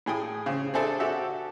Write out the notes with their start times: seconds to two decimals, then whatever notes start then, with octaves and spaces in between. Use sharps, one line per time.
0.06 A2 G#4 G5 D#6
0.46 C#3 C4
0.74 C4 D4 G#4 A4 E5 G#5
1.00 F#4 G4 A4 E5